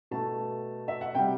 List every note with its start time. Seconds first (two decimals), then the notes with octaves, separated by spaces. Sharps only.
0.11 B2 A3 A5
0.88 E5
1.01 F#5
1.15 C3 G3 G5